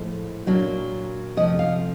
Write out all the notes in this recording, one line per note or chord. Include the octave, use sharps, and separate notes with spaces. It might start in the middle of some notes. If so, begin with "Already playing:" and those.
Already playing: A2 F3 G#3
A#2 F#3 A#3 D4
F2 C3 F3 A3 D#5
F5